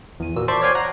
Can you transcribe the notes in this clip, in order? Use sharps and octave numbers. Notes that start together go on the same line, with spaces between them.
E2 D#7
A#2 F#4 E6
C5 D5 E5 A5 C6 C#6
C#5 D5 F5 G5 G#5 C6
F#5 A#5